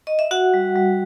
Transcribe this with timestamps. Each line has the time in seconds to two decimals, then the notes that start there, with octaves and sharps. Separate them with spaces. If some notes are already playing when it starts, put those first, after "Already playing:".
0.07 D#5
0.19 E5
0.31 F#4 F#5
0.54 G3
0.76 G3